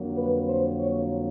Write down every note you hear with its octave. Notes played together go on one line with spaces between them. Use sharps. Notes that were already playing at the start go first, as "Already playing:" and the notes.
Already playing: F2 D3 F#3 A#3
B4
C5
C#5